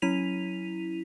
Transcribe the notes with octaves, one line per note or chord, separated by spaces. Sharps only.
F#3 C#4 E4 B6 D#7 F7